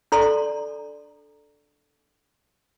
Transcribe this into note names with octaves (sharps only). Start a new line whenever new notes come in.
D4 A4 D5 A#5 C6